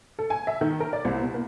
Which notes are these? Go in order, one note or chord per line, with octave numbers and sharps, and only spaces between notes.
A4
G#5
E5
D#3
A#4
D5
C2
B2
A#3